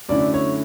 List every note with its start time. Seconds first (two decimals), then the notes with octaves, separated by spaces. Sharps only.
0.09 F#2 D3 A3 C#4 E4 D5
0.34 C#5